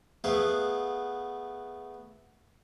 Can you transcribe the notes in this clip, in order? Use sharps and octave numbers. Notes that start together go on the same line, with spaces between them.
A3 B3 G#4 B4 F5 F#5